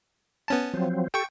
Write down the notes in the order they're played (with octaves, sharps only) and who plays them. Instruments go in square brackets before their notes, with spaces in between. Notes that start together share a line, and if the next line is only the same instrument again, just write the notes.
[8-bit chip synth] B3 C#4 A5
[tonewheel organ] F3 F#3 C4
[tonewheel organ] G4 A4 [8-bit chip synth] G5 C#6